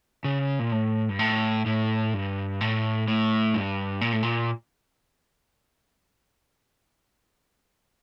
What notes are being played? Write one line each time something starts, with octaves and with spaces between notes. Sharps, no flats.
C#3
A#2
A2
G2
A2
A2
G2
A2
A2
G2
A#2
A2
A#2